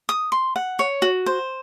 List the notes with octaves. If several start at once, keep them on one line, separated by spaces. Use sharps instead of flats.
D#6
C6
F#5
C#5
F#4
C5